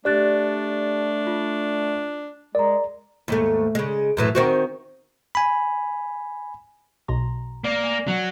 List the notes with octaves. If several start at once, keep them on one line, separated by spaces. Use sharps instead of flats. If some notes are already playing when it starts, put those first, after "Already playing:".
A3 D4 G4 D5 F#6 A6
F4
G#3 A#4 D5 A#5
D#2 G#2 A3
C#3 G#3
F#2 A2 E3
D#3 C4 F#4
G#5 B5
B1 B2 A#5 C6
A#3 D5
G#5
F#3